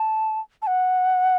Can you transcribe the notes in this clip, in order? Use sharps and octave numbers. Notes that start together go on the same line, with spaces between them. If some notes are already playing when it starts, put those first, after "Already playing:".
Already playing: A5
A5
F#5